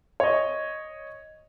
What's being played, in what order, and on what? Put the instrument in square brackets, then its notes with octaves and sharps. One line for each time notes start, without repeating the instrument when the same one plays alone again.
[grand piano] C#5 D#5